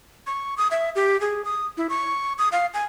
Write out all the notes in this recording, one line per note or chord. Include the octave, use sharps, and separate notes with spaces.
C#6
D#6
E5
G4
G#4
D#6
E4
C#6
D#6
F5
G#5